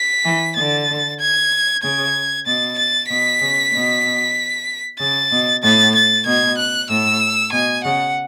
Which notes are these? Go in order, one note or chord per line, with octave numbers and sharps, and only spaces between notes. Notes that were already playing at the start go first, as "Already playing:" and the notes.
Already playing: B6
E3
D3 A6
G#6
C#3 G#6
B2 A6
A6
B2 B6
C#3
B2
C#3 A6
B2
A2 A6
A6
B2 G#6
F#6
A2 E6
B2 G#5
C#3 F#5